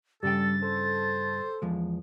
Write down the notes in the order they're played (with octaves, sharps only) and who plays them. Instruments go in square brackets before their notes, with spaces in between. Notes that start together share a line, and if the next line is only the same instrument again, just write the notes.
[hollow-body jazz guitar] G2 C#3 G5 [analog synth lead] G3 [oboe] A4 [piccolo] A6
[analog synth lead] A4 [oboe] C5
[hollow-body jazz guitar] E2 F3 G#3